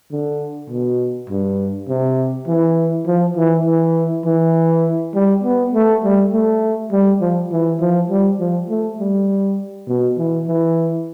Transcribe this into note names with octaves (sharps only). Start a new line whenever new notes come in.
D3
B2
G2
C3
E3
F3
E3
E3
E3
G3
B3
A3
G3
A3
G3
F3
E3
F3
G3
F3
A3
G3
B2
E3
E3